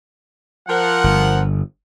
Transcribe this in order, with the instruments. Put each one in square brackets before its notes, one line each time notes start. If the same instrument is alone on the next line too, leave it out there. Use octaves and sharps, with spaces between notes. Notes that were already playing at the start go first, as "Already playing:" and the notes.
[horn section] F3 A#4 F#5
[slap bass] G1